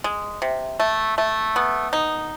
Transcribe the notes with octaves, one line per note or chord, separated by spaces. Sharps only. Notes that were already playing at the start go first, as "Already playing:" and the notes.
G#3
C3
A3
A3
B3
D#4